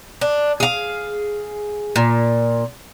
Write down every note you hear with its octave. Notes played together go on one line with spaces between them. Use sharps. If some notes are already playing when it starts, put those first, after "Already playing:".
D4
G#4 F5
A#2